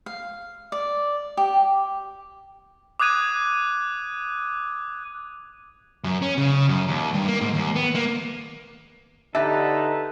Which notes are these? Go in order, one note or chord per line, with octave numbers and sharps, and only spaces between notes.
F5
D5
G4
D6 D#6 F#6 G#6 D#7
F#2
C#4
C#3
F#2
D#2
G2
A#3
G#2
D#2
B3
A#3
D3 D#4 G4 A4 B4 E5